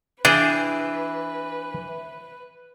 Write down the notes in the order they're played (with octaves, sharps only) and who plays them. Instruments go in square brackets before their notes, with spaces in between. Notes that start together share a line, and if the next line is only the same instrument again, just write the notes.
[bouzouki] E3 [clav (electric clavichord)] D4 G#4 G5 [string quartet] B4